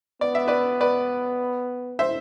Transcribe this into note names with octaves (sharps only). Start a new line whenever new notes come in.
B3 D5
E5
B4 D5
B4 D5
C5 E5